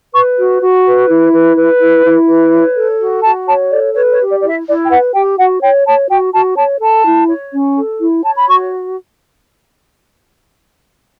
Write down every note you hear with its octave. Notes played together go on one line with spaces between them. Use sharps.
B4 C#6
F#4
F#4
B4
E4
B4
B4
E4
E4
B4
C#5
A4
F#4
F#4 A5
C#5 A5
A4 D5
B4 C#5
C#5
G4
D5
E4 D5
E5
E4 D5
G5
B4 F#5
G4 G5
F#4 F#5
C#5 G5
C#5 A5
F#4 G5
F#4 A5
C#5 A5
A4 A5
E4
C#5
C#4
A4
E4
C#5 A5
B5
F#4 C#6